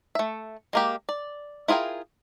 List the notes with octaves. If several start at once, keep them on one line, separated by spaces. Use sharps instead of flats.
A3 E5
G#3 A#3 G4
D5
E4 F4 G#4 A#4 G5